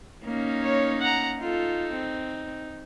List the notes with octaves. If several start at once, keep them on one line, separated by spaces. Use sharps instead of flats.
A#3 C#4 D#4
C#5
F#5 A#5
D#4 F4 A4
C4